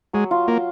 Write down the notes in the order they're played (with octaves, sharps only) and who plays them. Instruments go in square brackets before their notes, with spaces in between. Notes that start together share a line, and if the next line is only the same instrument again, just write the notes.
[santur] F#3 [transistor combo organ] G#3
[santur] F4
[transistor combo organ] A#3 [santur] F4